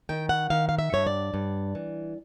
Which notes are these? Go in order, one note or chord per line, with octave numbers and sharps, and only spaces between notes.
D#3 G5
F#5
D#3 F5
F5
E5
G2 C#5
D5
G2
E3